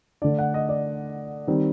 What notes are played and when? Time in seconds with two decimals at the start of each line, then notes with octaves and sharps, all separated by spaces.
0.22 D3 A3 D4 D5
0.39 F#5
0.54 D#5
0.69 D5
1.47 D#3 G3 C4 D#4